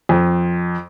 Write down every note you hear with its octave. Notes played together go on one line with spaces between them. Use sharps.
F2